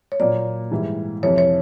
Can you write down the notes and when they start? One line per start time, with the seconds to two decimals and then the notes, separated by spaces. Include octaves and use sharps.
0.12 C#5
0.20 A#2 F#3 A#3 D5
0.71 G#2 E3 G3
1.23 F2 C3 E3 C#5
1.38 C#5